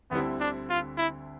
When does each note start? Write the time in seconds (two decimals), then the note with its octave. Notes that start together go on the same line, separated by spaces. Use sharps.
0.11 D2 D3 G3 B3 C4 E4
0.40 D4
0.70 F4
0.98 E4